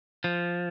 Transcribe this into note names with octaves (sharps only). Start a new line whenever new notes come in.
F3